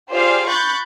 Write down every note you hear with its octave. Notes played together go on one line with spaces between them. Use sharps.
F4 G4 G#4 C5 D5 F5
B5 C#6 F#6 G6 A6